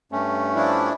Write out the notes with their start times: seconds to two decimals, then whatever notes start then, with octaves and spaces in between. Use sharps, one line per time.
0.12 G2 A3 C#4
0.55 F3 D4 E4